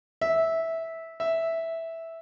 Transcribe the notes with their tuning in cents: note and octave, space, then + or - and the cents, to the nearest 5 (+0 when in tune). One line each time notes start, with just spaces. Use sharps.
E5 -10
E5 -5